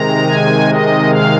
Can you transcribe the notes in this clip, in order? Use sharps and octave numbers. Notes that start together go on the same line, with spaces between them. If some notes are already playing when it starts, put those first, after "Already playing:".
Already playing: C3 D#3 G#3 A#5
G#5
D#5
F5